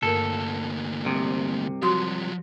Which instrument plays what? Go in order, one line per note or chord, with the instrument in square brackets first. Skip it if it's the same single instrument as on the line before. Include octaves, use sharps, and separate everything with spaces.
[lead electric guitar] D2 A#3 [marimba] G2 A#4 [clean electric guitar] A4
[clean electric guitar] C2 C3
[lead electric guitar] F3 F#3 [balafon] F#4 C6